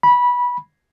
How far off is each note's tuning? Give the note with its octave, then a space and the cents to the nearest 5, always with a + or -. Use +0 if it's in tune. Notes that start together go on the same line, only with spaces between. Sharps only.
B5 -15